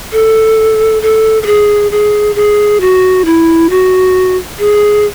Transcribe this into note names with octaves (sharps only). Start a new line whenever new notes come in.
A4
A4
A4
G#4
G#4
G#4
F#4
E4
F#4
G#4